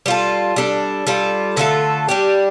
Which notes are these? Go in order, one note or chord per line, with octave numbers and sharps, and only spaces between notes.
G3 F4 A4
G3 D4 A4
G3 F4 A4
D3 A3 F4 A4
G3 D4 G4